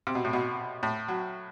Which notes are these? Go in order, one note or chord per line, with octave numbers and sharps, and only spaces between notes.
C3
B2
A2
B2
A2
F#3